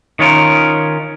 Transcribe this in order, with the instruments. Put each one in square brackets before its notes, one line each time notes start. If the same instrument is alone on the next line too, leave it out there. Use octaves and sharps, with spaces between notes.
[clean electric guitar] D#3 C#4 F4 A#4